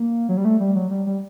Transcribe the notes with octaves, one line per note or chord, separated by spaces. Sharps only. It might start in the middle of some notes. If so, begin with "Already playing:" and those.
Already playing: A#3
F#3
G3
A3
G3
F#3
G3
G3